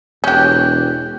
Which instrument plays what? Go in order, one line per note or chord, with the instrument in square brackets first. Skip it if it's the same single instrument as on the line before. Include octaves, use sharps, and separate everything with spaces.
[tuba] E1 [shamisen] C#4 G4 [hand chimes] F#6 G6